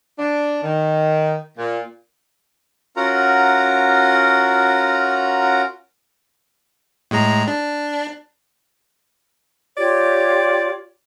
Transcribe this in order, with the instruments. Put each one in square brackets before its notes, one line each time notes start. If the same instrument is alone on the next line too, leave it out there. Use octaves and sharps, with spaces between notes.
[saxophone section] D4
D#3
A#2
[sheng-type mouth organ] C#4 F4 F#4 A#4 F#5 A#5
[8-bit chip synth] A2 G#3 A#5
D4
[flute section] F4 G4 C#5 [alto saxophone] D5